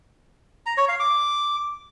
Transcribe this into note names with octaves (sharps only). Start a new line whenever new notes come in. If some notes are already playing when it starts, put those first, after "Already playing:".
A#5
C#5
F5
D6